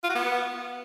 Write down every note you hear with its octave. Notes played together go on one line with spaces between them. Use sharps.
F4
F#4
B3